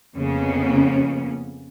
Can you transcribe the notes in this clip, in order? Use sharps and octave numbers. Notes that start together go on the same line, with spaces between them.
F2 C#3 A#3 B3 C#4